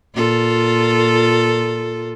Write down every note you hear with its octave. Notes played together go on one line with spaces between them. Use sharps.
A#2 F4 A4